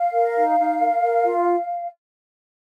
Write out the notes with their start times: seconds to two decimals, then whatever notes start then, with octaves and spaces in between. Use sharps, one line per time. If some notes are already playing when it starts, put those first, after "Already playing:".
Already playing: F5
0.13 A#4
0.36 D#4
0.58 D#4
0.80 A#4
1.02 A#4
1.25 F4